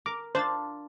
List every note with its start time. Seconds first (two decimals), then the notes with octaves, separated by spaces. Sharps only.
0.06 A#4 D6
0.35 D4 F4 C5 A6